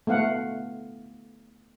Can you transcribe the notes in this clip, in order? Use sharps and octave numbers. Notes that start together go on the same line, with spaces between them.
A3 B3 F5 F#5